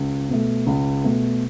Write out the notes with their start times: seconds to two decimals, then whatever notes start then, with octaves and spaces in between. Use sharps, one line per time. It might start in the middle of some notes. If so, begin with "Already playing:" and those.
Already playing: C#2
0.29 B2 A3
0.66 C#2
1.04 B2 A3